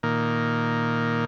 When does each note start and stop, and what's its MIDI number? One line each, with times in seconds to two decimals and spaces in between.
0.03 1.25 46
0.03 1.25 51
0.03 1.25 58